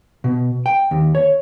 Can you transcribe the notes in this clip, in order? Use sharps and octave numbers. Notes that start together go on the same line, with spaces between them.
B2
G5
D#2
C#5